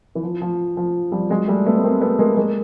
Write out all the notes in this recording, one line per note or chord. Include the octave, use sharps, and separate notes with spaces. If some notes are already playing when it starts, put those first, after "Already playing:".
E3
F3
F3
F3
F3 G3
F#3 G#3
G3 A3
A3 B3
B3
A#3 C4
A3 B3
G#3 A#3
G#3 A#3